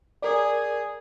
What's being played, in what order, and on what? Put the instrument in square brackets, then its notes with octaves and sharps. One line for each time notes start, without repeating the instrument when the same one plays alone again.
[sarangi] G#4 [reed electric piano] A#4 D5